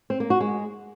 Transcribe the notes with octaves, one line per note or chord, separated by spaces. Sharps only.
C4
A#3
F#4
G#3